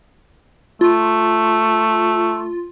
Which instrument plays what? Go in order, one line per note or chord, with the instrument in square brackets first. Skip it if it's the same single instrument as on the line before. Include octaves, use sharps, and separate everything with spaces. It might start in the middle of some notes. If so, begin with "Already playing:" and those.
[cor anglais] A3 [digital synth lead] F4